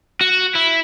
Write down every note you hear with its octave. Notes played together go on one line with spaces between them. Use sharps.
F#4
E4